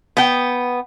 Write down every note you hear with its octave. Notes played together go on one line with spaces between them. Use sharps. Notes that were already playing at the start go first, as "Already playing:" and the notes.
B3 G5